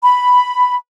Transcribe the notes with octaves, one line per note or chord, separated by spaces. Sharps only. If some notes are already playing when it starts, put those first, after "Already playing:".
B5